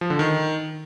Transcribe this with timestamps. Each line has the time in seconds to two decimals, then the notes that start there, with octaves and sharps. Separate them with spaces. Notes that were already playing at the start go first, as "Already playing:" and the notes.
0.01 F3
0.10 D3
0.19 D#3